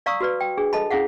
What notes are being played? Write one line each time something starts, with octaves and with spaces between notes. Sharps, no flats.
D5 F5 A#5 C#6 D#6 E6
F#4 B4 D5
G5
D4 G#4
A4 D#5 A5 B5
C#4 E4 G#4 F5 F#5